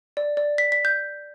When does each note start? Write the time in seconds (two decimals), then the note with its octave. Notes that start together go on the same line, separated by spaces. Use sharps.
0.17 D5
0.37 D5
0.58 B6
0.72 B6
0.85 G6